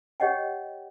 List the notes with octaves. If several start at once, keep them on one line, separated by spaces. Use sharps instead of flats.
G4 C#5 D#5 F#5 G5